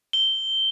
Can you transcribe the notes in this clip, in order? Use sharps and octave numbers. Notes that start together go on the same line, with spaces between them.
G7